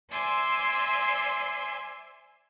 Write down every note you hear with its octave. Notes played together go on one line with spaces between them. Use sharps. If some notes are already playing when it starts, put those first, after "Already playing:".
C5 D5 E5 G#5 C6